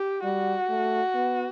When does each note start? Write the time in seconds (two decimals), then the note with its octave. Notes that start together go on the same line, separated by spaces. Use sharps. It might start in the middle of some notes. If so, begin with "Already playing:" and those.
Already playing: G4
0.24 G3 F#4
0.69 A3
1.15 B3